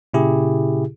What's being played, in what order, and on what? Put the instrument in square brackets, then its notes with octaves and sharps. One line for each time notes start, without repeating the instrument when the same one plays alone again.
[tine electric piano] A#2 C#3 E4 G4 G#4